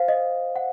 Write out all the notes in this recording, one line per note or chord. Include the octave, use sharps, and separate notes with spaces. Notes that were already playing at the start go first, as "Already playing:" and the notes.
Already playing: C5 F5
D#5
F#5